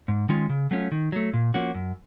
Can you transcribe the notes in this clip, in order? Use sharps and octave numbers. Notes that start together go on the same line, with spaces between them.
G#2
D#3 G#3 C#4 F4
C#3
F#3 A3 C#4 F4
D#3
F#3 A3
A#2
F3 A#3 C#4 F#4
F#2